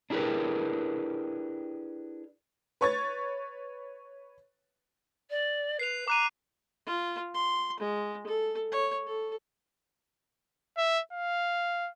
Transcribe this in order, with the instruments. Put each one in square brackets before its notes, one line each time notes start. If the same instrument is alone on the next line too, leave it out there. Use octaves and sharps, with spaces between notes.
[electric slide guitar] D4 E4 G4 G#4 A#4 B4
[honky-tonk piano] B4 C#5 C#6 G#6 A6
[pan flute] D5
[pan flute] B4 [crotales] C7 F7
[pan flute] A#5 [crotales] D6 F#6 D#7
[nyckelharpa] F4
C6
G#3
A4
C#5
A4
[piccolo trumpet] E5
F5